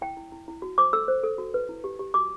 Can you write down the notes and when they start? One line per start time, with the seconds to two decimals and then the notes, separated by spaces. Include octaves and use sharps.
0.02 E4 G5
0.17 E4
0.32 E4
0.48 E4
0.62 F#4
0.78 C5 D6
0.93 A4 E6
1.08 C5
1.23 A4
1.38 F#4
1.54 B4
1.69 E4
1.84 G4
1.99 G4
2.14 F#4 D6